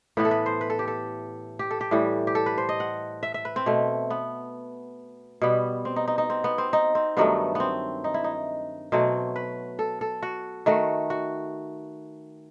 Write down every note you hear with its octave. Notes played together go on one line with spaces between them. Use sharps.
A2 E3 B3 B4
A4
B4
C5
B4
A4
G4
A4
G4
A4
G4
A2 E3 G3
G4
A4
B4
C5
D#5
F#5
E5
E5
B4
C4
B2 A3
B3
B2 G3 B3
C4
D#4
D#4
D#4
C4
B3
C4
D#4
C4
G2 D#3 F#3 A3 B3
B3 C4
D#4
E4
D#4
B2 F#3 A3 C4
B4
A4
A4
F#4
D#3 A3 F#4
F#4